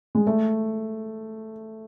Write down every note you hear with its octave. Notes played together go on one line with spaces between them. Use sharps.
G#3
A3